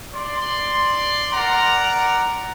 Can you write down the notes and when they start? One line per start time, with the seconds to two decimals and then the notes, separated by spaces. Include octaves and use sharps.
0.14 D5 C6
1.33 A#4 D5 F#5 A#5